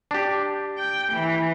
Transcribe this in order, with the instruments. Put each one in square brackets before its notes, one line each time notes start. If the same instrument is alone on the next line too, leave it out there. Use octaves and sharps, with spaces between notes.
[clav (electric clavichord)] D4 G4
[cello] G5
E3